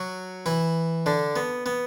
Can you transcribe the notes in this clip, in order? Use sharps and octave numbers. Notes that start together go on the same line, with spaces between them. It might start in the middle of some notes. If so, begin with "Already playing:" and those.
Already playing: F#3 F#4
E3 E4
D3 D4
B3
B3